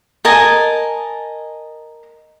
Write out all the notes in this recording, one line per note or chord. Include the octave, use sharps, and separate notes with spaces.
A#4 D#5 G#5 A5